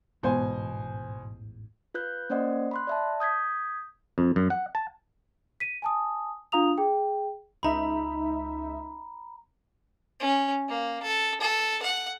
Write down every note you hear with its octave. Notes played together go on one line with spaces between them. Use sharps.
A1 E2 G#2 B2 C5 G#5
F4 B4 F#6 G6
A#3 C#4 C5 D5 D#5 F#5
B5 C6 F#6
D5 E5 A5
D#6 G6 G#6 B6
F2
F#2
F#5
A5
B6 D#7
G#5 A5 D#6
D4 F4 F5 A#5 D#6 F7
G#4 G5
C#2 D#4 E5 A#5 B5
C#4
A#3
A4
A4
F#5